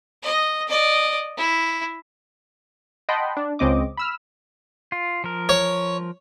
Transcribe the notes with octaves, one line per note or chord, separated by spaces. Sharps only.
D#5
D5 D#5
E4
D#5 F#5 G5 A5 B5 C6
D4
C#2 C#3 C4 D#5 D6
B5 E6 F6
F4
F3 A#4
C#5